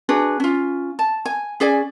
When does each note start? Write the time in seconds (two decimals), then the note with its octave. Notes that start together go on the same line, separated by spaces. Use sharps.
0.09 D4 F#4 G#4 B4
0.40 C#4 F4
0.99 A5
1.25 G#5
1.60 C#4 G#4 D5 G#5